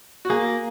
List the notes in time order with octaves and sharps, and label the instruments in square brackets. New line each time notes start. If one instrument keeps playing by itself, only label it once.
[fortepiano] F#4
[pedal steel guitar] A#3 [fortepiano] G#4